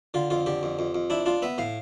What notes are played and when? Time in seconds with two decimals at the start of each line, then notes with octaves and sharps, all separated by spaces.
0.14 D3 F4
0.30 F2 F4
0.46 D3 G4
0.63 F2
0.79 F2
0.95 F2
1.10 D4 E4
1.26 D4 F4
1.42 B3 E5
1.58 A2 F5